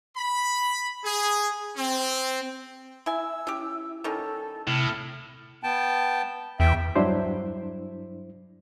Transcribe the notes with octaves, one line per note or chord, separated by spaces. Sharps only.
B5
G#4
C4
E4 E5 G#5 E6
C#4 E4 G4
D#3 G3 C#4 A4
A2 C3 F6
B3 G5 A5
E2 E5 G5
G2 F#3 D4 E4 C5